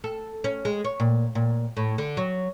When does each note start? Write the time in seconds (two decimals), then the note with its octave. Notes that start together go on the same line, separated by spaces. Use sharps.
0.04 A4
0.44 C#4
0.65 G#3
0.84 C#5
1.00 A#2
1.35 A#2
1.77 A2
1.98 D3
2.17 F#3